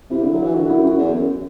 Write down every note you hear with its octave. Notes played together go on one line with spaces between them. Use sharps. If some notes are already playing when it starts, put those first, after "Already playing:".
C3 E4
D3
F#3
E3
D3 F#4
F#2 E4
F#2 F#4
E2
F#2